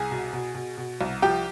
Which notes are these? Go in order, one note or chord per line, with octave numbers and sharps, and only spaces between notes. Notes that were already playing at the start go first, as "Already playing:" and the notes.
Already playing: C2 G#4 G#5
B2
B2
B2
B2
C2
F3 G4 G5